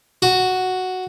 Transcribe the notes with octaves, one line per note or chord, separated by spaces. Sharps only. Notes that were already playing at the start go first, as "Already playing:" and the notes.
F#4